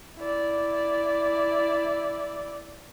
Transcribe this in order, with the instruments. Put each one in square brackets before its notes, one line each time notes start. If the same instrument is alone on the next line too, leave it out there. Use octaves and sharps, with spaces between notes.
[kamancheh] E4 D5